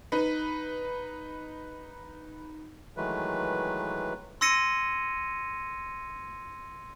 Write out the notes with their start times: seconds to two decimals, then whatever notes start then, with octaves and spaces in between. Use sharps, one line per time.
0.12 D#4 B4
2.97 D#3 E3 F#3 G#3 A3 B4
4.41 C6 E6 G#6 A#6 C#7 D#7